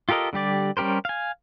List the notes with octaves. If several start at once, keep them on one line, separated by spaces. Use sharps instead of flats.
F4 G4 A4 A#4 D#5
D3 G3 G4 D5
G3 C#4 G4 A#4 C5
F5 G#5